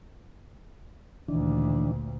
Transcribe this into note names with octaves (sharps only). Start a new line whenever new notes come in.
D2 A#2 D#3 E3 D4